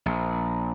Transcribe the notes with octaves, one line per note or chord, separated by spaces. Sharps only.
A#1